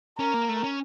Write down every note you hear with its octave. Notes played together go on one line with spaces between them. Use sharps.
C#4 A#4
A#3
A3
C#4